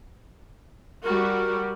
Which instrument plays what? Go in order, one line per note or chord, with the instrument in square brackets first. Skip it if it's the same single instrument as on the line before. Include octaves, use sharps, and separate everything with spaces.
[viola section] G3 F#4 [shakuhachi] A#4